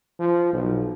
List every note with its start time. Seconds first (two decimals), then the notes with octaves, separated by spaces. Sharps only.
0.19 F3
0.53 B1